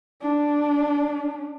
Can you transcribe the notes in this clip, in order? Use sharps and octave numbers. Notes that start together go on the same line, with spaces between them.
D4